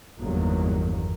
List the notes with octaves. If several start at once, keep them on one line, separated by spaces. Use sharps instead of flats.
G1 E2 D#3 F#3 A#3